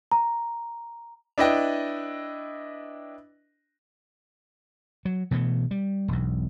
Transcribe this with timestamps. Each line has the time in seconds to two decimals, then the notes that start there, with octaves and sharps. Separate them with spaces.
0.12 A#5
1.38 D4 E4 B4 D#5 G5
5.05 F#3
5.31 B2 E3 G3 A3
5.71 G3
6.08 E1 B1